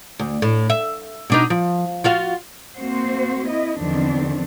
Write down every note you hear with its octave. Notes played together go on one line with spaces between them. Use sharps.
D2
A2
E5
B2 D4 D#4
F3
F4 F#4 F5
A#3 C4 F#4 C5
E4 D#5
E2 D3 D#3 F3 C4 D4